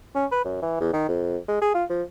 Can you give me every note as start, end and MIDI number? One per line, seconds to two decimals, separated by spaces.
0.15 0.26 61
0.31 0.43 71
0.45 0.60 42
0.62 0.80 52
0.80 0.91 40
0.93 1.08 51
1.08 1.37 41
1.48 1.59 56
1.61 1.70 68
1.74 1.84 65
1.89 2.03 53